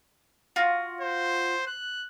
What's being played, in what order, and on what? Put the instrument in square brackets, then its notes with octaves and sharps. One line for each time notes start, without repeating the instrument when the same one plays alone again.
[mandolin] F4 F#4
[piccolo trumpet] C5
F#6